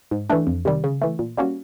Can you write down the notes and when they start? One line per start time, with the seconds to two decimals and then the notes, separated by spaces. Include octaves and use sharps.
0.11 G#2
0.30 E3 A3 D4
0.47 F2
0.65 C3 D#3 G3
0.84 C#3
1.02 E3 A3
1.19 A#2
1.37 G3 A#3 C#4 F#4